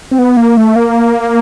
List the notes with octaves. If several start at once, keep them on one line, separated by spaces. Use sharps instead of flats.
C4
B3
A#3
A3
A#3